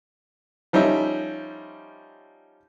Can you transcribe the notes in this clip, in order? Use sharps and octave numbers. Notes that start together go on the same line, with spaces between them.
F3 G3 C#4 D#4 E5